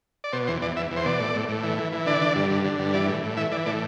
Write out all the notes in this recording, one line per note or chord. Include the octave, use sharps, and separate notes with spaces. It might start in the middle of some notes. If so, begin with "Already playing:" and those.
D5
B2 C5
E2 C5
E2 D5
E2 E5
E2
C5
B2 D5
A2
A2
A2
E3
E3
E3
D3 D5
D3
G2
D3
D3
G2
E3 D5
A2
A2
E3 E5
E3 D5
A2 D5